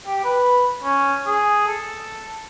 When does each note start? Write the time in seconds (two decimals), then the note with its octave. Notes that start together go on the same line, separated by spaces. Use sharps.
0.06 G4
0.24 B4
0.84 C#4
1.27 G#4
1.67 A4